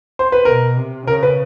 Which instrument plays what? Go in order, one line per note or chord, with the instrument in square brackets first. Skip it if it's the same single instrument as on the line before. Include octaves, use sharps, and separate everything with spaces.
[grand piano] C5
B4
[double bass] B2 [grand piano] A#4
[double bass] C3
[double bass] C#3 [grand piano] A#4
[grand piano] B4